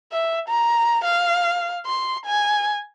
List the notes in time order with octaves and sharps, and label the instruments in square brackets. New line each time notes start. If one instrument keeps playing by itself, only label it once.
[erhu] E5
A#5
F5
C6
G#5